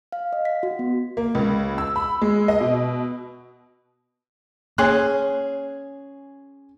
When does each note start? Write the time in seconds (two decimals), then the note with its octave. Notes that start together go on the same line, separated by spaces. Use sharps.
0.12 F5
0.33 D#5
0.45 B6
0.63 F#4
0.79 B3
1.17 A#3
1.35 C#2
1.78 E6
1.96 B5
2.22 G#3
2.48 D#5
2.61 B2
4.78 A#3 C#4 G#4 C6 F#6